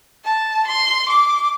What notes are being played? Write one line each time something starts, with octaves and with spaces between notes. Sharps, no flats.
A5
C6
D6